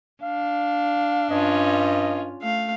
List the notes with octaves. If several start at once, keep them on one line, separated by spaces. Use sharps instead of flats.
D4 F5
G2 C#4 F4 D#5
A3 F5